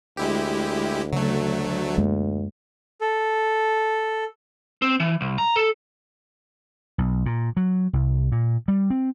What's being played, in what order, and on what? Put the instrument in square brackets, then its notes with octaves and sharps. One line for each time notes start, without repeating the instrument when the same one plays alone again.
[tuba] D2 [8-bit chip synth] G#3 E4 G4
[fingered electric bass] C#3 [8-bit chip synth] F#3 A3
[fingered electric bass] F#2 G#3 A#3
[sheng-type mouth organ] A4
[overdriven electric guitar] C4
E3
C2
A#5
A4
[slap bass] B1
A#2
F#3
C2
A#2
G3
C4